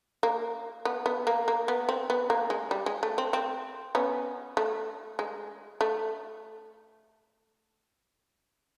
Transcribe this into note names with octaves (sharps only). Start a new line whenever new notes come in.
A#3
B3
B3
A#3
A#3
B3
C4
B3
A#3
G#3
G3
G#3
A3
C4
C4
B3 C#4
A3
G#3
A3